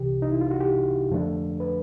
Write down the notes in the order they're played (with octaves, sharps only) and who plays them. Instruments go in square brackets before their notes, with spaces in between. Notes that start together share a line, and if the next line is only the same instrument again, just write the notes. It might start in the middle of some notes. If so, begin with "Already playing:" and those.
Already playing: [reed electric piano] C2 C3 E3 G4
D#4
E4
F4
F#4
G4
F2 D3 F3 A3 D4
B4